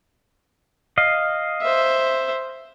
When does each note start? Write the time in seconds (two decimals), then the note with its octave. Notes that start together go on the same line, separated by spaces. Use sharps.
0.98 D#5 F5
1.62 C5 E5